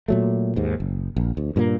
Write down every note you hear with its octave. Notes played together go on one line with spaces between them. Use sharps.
A#2 F#3 A3
D#2 G#2
F#1
A#1
D2
G2 A#2 G#3 A#3